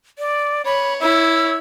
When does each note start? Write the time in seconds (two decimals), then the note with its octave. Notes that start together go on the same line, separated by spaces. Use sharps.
0.19 D5
0.65 C#5 B5
1.01 E4 C#5 E6